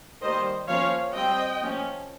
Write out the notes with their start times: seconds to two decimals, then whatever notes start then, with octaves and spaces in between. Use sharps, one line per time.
0.21 D#3 G3 A#3 C5 D#5
0.68 F3 A#3 C#4 C#5 F5
1.14 G3 C4 D#5 G5
1.60 F3 A#3 C#4